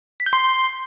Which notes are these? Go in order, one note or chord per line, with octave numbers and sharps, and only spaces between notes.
B6
G6
C6